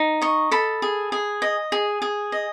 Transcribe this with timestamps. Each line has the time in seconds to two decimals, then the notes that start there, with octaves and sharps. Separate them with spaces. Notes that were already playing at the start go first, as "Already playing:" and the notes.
Already playing: D#4
0.21 D#5 C#6
0.51 A4 B5
0.82 G#4
1.12 G#4
1.42 D#5
1.72 G#4
2.02 G#4
2.32 D#5